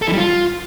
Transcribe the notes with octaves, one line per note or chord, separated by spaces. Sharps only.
A4
E3
G3
F4